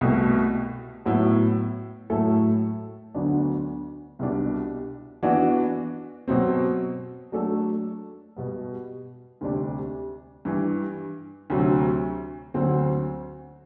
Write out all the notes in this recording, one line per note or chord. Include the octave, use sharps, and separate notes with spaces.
C2 B2 A3
A2 F#3 B3 E4
A2 F#3 A3 E4 A4
D2 D3 F#3 B3 D4
C2 B2 G3 D4
E3 B3 D4 F#4
B2 F#3 C4
F#3 A3 D4 A4
B2 G3 B3
D2 C3 G3 D4 G4
G2 E3 G3
D2 C3 F#3
D2 D3 F#3 C4